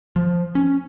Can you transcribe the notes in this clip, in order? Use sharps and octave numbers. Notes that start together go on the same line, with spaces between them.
F3
C#4